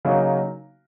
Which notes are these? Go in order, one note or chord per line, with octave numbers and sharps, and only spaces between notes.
C#3 F#3 A#3 D#4 F#4